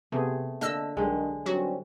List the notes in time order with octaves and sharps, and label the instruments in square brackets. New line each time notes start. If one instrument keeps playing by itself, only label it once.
[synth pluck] C3 [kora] A3 [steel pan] B3 C4 G#4
[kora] D3 [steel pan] A#3 [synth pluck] D#5 A5 E6
[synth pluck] B1 [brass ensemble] G2 D#3 [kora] D3 G#3
[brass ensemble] G2 C4 C#4 [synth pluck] F#3 F#4